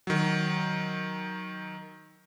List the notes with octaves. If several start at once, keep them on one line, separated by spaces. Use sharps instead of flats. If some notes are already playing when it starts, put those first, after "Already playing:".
D#3 F#3